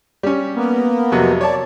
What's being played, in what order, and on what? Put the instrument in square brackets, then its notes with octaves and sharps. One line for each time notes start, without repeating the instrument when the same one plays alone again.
[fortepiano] G3 C#4
[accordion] A#3 B3
[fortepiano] F2 C3 F#3
[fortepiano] C#5 A5 [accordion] D5